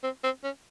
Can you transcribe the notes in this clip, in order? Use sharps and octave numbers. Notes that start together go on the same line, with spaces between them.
C4
C4
C#4